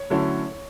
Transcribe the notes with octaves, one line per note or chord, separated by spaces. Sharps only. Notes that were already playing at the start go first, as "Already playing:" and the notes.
Already playing: C#5
D3 F#3 A3 C#4 E4